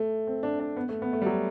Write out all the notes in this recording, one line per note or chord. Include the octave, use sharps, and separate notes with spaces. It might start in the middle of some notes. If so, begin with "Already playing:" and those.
Already playing: A3
C4
D4
D4
B3
A3
B3
A3
G3
F#3